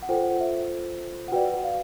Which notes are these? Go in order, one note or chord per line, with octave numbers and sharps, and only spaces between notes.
F#5
F4 A4 C5 G5
F#5
E5
F#5
F#4 B4 D5 G5
F#5
F5